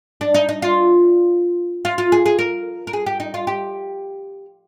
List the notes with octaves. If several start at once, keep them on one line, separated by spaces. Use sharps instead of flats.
D4
D#4
D#4
F4
F4
F4
G#4
G#4
A#4
A#4
G#4
G4
D#4
F4
G4